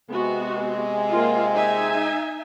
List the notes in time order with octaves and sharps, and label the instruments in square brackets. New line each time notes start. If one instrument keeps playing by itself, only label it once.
[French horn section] C3 G#3 [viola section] B3 F#4
[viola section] A#3 F4
D#4 E5 G#5